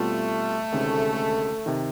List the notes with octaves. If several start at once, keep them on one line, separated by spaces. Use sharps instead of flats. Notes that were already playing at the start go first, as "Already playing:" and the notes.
Already playing: B2 G3 A3 C4 F4
D2 C3 D#3 G#3 C#4
C3 D#3